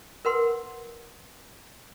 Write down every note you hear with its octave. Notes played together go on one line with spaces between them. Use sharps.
A#4 B4 F#5 C6